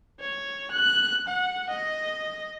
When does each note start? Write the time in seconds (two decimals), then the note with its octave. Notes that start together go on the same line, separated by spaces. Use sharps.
0.20 C#5
0.71 F#6
1.28 F#5
1.70 D#5